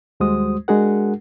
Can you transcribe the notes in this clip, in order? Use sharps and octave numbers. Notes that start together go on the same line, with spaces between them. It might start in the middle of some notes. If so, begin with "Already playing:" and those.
D#2 G3 G#3 F#4 C5 D#6
G#3 D4 F#4 G#4 A#4 F#5